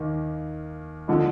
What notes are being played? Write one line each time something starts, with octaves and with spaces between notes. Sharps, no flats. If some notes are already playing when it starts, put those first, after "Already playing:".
Already playing: D#2 D#3 A#3
D3 F3 G#3